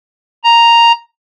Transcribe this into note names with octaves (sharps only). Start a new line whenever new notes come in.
A#5